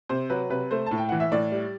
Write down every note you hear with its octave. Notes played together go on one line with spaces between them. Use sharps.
C3 C5
F#3 B4
C3 B4
A3 C5
A2 A5
G5
E3 F#5
E5
A2 D5
G3